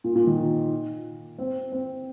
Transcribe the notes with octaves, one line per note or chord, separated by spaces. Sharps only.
A#2
A#2
D#3
C4
C4